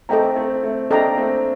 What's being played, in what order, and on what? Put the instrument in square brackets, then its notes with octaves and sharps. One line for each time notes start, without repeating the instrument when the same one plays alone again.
[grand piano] A3 C4 [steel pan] A4 D#5 G5 A#5
[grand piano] A3 C4
A3 C4
[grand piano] A#3 D4 [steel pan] A4 D#5 G5 A#5
[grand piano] A3 C4